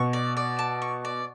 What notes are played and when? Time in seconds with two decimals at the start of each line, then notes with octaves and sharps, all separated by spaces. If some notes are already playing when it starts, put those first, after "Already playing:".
Already playing: B2 C#6
0.13 D5
0.37 D5
0.59 A5
0.82 C#6
1.05 D5